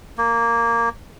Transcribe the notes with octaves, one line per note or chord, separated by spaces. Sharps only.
A#3